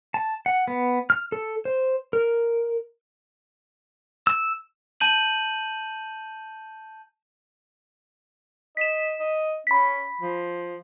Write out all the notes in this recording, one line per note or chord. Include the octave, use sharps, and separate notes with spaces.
A5
F#5
B3
F6
A4
C5
A#4
E6
A5 G6 D#7 F#7
D#5 B6 E7
D#5
C#4 B5 B6
F3